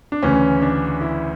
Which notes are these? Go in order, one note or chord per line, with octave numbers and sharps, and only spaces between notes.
D4
D2 C#3 E3 C#4
D4
E4